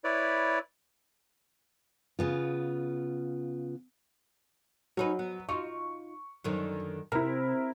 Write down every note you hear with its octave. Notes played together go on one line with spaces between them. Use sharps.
E4 B4 C#5 D5
C#3 B3 F4
F#3 C#4 D#4 B4
B3
D#4 F4 F#4 C#6
F#2 D3 D#3
C3 E4 A#4